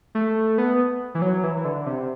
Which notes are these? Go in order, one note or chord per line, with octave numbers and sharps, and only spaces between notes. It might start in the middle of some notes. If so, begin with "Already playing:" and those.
A3
B3
E3
F#3
E3
E3
D3
C3